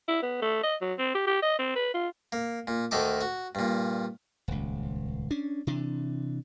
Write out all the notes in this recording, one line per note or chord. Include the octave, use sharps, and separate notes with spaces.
E4
B3
A3
D#5
F#3
C4
G4
G4
D#5
C4
B4
F4
A#3
A#2
D2 D#3 D#4 A4 D6
F#4
G2 A#2
D#1 C#2
C#4 D4
C3 E3 D4